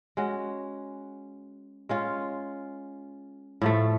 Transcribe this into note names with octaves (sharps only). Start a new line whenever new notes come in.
G#3 C#4 F#4
G#3 C#4 F4
A2 F3 A3